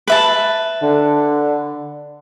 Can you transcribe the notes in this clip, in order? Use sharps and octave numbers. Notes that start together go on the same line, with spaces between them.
B4 E5 A5
D3